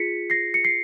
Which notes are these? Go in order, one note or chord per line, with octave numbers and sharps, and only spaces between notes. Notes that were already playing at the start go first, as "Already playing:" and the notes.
Already playing: F4 G#4 B6 C#7
A#6 C7
C#7
C7